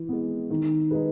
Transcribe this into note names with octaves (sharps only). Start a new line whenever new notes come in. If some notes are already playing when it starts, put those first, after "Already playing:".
Already playing: E3
G#3 B3
D#3
G#3 D#4 G#4 B4